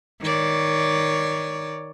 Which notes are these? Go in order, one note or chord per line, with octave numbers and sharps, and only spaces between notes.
D#3 C#5 D5